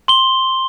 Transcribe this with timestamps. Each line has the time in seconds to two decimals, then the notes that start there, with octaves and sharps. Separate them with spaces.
0.08 C6 G7